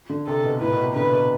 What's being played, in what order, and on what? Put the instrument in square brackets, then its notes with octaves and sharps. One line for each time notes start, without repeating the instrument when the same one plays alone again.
[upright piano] D3
[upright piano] C3 [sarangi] A4
[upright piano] B2
[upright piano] A2 [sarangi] B4
[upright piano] B2
C3
[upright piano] D3 [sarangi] B4
[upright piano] B2